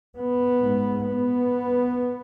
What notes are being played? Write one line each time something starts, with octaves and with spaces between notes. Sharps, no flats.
B3
G#2
B3